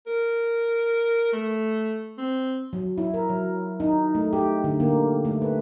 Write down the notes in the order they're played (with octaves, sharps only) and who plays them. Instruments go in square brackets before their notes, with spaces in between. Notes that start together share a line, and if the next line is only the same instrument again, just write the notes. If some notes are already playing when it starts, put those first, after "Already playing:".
[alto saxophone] A#4
A3
C4
[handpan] F#3
E4
A#4
F#3
D#4
A3
G4
D3
A#3
A3
B4